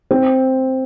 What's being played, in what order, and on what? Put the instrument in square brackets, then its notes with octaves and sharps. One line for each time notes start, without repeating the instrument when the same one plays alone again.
[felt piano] C4